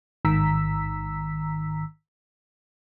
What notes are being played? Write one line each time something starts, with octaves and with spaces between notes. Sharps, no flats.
A1 G#2 D#3 A#5 E6 B6